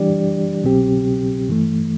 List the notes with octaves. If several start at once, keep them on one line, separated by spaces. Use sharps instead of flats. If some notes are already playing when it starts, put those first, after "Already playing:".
Already playing: E3 G3 D4 G4 D5
C2 B2 F#3 C4 G4
G2 E3 A3